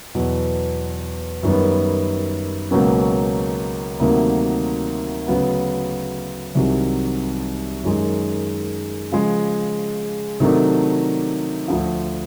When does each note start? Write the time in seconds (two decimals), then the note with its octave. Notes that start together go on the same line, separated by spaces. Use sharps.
0.15 E2 B2 F#3 B3
1.43 F#2 D#3 G3 B3
2.71 C#2 B2 F#3 A#3 C#4
3.99 D2 C3 D#3 F#3 A#3
5.28 D2 C#3 F#3 B3
6.55 C2 C3 D#3 F#3
7.84 F#2 D#3 G#3
9.11 C#3 F3 G#3
10.40 C3 D#3 F#3 A3 D4
11.68 D2 D3 F3